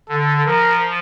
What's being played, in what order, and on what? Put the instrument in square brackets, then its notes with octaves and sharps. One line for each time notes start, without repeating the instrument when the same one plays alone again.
[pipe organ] D3 [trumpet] A4
[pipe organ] F3 [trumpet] A#4